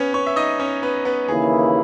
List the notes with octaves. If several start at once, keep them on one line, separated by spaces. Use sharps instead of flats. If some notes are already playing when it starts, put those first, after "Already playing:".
Already playing: B3 C#4 B4 C#5
C#4 C#5
E5
D#4 D#5
C#4 C#5
B3 B4
B3 B4
D#2 C#3 E3 A#3 E4 G#4